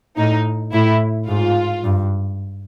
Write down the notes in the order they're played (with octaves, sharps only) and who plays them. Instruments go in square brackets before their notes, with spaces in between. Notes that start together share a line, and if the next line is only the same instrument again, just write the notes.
[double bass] A2 [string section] D#4
[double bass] A2 [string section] E4
[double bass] G#2 [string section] F4
[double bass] G2